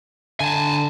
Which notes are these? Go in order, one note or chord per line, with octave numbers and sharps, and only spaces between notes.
D3 G#5 A5